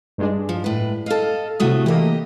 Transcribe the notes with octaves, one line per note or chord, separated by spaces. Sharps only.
G2 G#3 D4
F3
A2 B4
A4 D#5 F5 F6
A2 C3 A3 F#4 D#6
E3 A3 A#3 G4 D#5